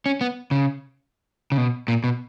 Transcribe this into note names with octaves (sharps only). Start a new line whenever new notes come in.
C#4
B3
C#3
C#3
B2
A#2
B2